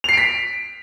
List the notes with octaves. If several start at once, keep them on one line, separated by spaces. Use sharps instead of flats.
B6 C7 D7 F7